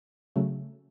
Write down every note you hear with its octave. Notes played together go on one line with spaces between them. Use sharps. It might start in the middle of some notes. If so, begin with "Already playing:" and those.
C#3 F#3 A3